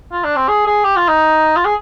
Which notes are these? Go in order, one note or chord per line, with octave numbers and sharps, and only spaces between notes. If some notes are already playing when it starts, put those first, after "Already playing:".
F4
D4
C4
G#4
G#4
G4
F4
D#4
F4
G#4